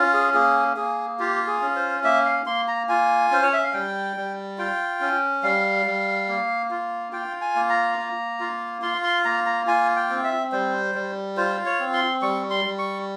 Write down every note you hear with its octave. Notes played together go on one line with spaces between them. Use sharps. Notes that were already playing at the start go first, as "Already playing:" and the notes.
Already playing: C#4 F4
G#4
A#3 G#4
A#3 G#4
F4 G4
G#4
C#4
C5
A#3 E5
F5
A#3 C6
A#5
F4 G#5
C#4 C5
C#5
E5
F5
G3 G5
G3
F4 G5
C#4
G3 F5
G3
A#3
F4
F4 G5
G#5
A#3
A#5
A#3
F4
F4 C6
C6
A#3 A#5
A#5
F4 G#5
G5
C4
E5
G3 C5
G3
F4 C5
C#5
C4
C6
G3 C#6
C6
G3
C#6